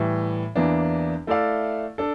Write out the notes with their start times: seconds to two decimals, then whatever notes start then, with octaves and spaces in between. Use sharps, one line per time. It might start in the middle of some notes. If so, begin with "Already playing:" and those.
Already playing: A2 E3 G3
0.56 E2 E3 A#3 D4
1.27 A3 E4 A4 D5 F5
1.98 D4 A4